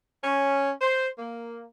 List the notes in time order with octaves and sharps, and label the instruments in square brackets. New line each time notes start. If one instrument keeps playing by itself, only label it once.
[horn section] C#4
C5
A#3